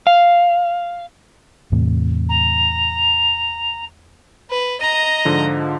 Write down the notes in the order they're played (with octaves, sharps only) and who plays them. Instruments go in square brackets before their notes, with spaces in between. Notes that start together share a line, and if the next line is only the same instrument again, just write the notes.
[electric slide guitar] F5
[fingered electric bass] E2 A2 C3
[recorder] A#5
[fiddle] B4
[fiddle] D#5 A#5 [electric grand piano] D#7
[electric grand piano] G#2 D3 F3